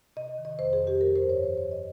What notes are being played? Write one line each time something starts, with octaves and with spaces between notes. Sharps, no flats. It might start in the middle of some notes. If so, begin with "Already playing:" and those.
C3 D#5
D#3
D#5
F2 C5
G#4
F2
G4
F3 A#4
C5
G2
C#5
F3 C5
C#5
G2
D#5